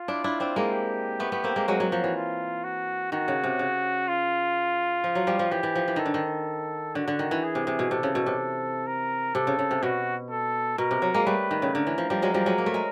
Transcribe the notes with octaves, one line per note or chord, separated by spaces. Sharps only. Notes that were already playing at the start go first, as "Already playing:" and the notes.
Already playing: F4
D4 E4
D4 E4
C4 D4
G#3 A#3
G4
A3 B3
A3 B3
A#3 C4
G#3 A#3
F#3 G#3 F#4
F#3
F3
E3
F4
F#4
D#3 F#4
C#3
C3
C#3
F4
F3
F#3
F3 G3
F3
E3 G4
E3
F3
E3
D#3 A4
D3
D#3
D3 F#4
D3
D#3
E3
G#4
C3
C3
B2
C3 A4
C#3
B2
C3
A#4
C3 A4
C#3
C#3
C3
B2 F#4
A4
B2 A#4
C3
F#3
G#3 A#3
G3 A3 B4
D#3
C#3
D3 A#4
E3
F3
F3 G3
F#3 G#3
F3 G3
F#3 G#3
A#3
A3
G#3